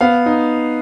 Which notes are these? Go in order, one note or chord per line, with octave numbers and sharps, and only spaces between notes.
B3 F5
D#4